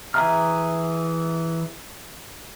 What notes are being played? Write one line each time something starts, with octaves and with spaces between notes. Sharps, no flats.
E3 G#4 E5 A#5 F6